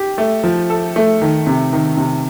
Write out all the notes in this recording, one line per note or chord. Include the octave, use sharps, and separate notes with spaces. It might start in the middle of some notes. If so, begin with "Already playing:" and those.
Already playing: G4
A3
F3
A4
A3
D#3
C3
D#3
C3